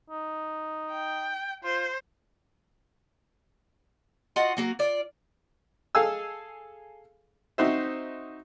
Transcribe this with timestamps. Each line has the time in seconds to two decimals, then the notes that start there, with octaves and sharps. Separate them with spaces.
0.10 D#4
0.92 G5
1.64 F4 C5
4.36 F4 F#4 D#5 F#5
4.57 F#3 A#3 F#4
4.79 F4 D5
5.95 G#4 A4 F5 G#5 E6
7.58 C4 D#4 F#4 C5 E5